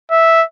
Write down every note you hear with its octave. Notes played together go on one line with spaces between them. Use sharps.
E5